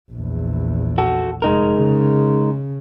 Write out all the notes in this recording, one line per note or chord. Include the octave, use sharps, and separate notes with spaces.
A#1 E2
F#4 A4
F1 G#3 D#4 A#4
C#3